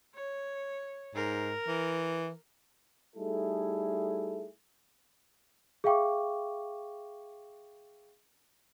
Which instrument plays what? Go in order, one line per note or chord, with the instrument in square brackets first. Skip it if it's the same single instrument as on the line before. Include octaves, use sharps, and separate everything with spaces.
[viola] C#5
[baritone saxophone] G#2 [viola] A#4
[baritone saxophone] E3
[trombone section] G3 A3 D#4 E4 G#4 A4
[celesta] G#4 E5 F5 G5 C#6 D6